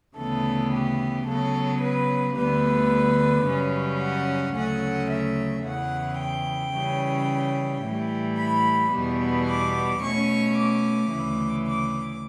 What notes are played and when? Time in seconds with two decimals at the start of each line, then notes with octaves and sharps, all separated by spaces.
0.15 D2 C#3 E3 B3 A4
0.71 G4
1.25 C#3 F#3 B3 A4
1.80 B4
2.34 D2 D3 G3 B3 B4
3.44 F#2 C#3 G3 C#4
3.99 F#5
4.54 D2 C#3 F#3 A3 C#4 F#5
5.08 E5
5.63 E2 C#3 E3 F#5
6.18 G5
6.73 C#3 E3 G3 C#4
7.82 A2 E3 G3
8.36 B5
8.92 E2 B2 G3 B3
9.46 D6
10.00 B2 A3 C#4 C#6
10.56 D6
11.10 D2 C#3 E3
11.65 D6